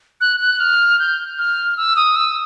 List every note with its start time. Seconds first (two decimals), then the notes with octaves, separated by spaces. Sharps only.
0.21 F#6
0.40 F#6
0.60 F6
0.99 G6
1.38 F6
1.77 E6
1.96 D#6
2.16 E6